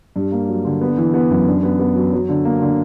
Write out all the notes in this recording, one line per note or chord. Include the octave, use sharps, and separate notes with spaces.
G2
A#3
F#3
D3
B3
E3
B3
F#2
D4
B3
B3
F#3
F#3
D3
A#3
D3